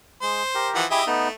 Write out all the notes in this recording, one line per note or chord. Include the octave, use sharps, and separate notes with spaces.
G#3 C5
G4 A#4
E3 F3 F#5
E4 G4 G#4 D#5 E5
A3 B3 D#4